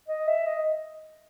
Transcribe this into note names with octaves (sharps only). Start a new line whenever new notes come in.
D#5
E5
D#5